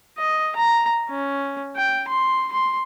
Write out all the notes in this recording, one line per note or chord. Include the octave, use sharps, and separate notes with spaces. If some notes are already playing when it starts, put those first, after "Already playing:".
D#5
A#5
C#4
G5
C6
C6